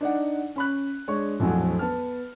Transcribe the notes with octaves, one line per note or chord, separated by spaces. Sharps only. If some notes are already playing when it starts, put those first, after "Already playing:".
D4 D#4 D5 F#5
C#4 B5 F#6
G#3 D4 C#5 C#6
A#1 F2 A2 F#3 G#5
B3 A5 F6